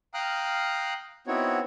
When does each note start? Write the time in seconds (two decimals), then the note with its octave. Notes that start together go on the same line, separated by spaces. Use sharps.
0.14 F5 G5 A#5 D#6 F6 F#6
1.27 B3 C4 D#4 E4 F#4 C#5